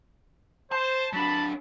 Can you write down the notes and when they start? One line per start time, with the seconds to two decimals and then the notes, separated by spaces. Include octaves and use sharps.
0.72 C5 A5
1.13 F#3 D4 A5 B5